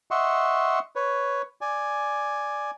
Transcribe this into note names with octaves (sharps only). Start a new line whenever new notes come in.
D#5 E5 F#5 C6 C#6
B4 C#5
D5 G#5